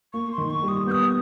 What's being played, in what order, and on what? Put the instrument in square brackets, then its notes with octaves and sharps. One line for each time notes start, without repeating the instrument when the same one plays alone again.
[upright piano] A#3 [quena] C#6
[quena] C6
[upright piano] D#3
[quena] C#6
[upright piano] G3
[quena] D#6
[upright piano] B3 [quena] G6
[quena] D#6